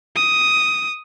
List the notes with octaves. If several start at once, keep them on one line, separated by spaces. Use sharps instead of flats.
D#6